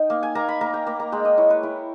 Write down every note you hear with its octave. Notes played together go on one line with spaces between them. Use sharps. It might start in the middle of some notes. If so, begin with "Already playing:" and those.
Already playing: D#4 G5
A#3
G#5
A#3 A#5
B5
A#3 A#5
G5
A#3 B5
A#5
G#3 G5
D#5
E4 C#5
B4
E4 A#4